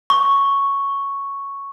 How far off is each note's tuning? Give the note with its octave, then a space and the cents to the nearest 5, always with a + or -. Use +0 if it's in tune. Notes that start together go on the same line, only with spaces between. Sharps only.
C#6 +0